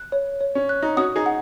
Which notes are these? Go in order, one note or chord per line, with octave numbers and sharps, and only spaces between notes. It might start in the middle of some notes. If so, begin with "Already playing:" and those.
Already playing: F#6
C#5
C#5
C#4
F#6
D#4
C#4 F#4 D#6
D#4 G#4
F#5